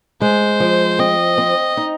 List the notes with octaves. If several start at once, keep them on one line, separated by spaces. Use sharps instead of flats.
G#3 C5
F3
C4 D#5
C4
D#4